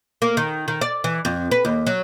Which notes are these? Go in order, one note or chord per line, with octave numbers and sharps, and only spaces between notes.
A#3
D#3
D#3
D5
E3
F2
B4
D#2
F#3